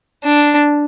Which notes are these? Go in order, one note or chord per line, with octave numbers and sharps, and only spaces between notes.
D4